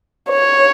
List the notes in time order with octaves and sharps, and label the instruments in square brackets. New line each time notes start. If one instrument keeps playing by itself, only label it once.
[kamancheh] C#5